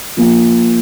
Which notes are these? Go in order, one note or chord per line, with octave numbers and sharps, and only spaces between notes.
F3 A#3 F4